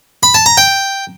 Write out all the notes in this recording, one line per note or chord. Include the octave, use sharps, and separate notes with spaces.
B5
A5
A#5
G5